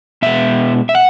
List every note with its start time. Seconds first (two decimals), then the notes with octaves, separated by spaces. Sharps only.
0.22 B2 G#3 B3 E5
0.89 E5
0.95 F#5